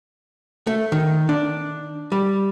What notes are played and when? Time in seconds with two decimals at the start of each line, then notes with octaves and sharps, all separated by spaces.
0.67 A3
0.92 D#3
1.29 D4
2.12 G3